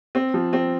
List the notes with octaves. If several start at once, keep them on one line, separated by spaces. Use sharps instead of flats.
C4
F3
C4